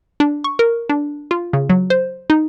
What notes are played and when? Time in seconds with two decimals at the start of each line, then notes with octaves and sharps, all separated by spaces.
0.20 D4
0.44 C#6
0.59 A#4
0.89 D4
1.31 F4
1.53 C#3
1.70 F#3
1.90 C5
2.30 D#4